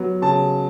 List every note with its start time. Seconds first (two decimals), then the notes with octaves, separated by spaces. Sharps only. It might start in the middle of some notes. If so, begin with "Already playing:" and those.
Already playing: F#3 B3
0.22 C#3 A5